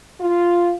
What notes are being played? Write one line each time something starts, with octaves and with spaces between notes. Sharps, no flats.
F4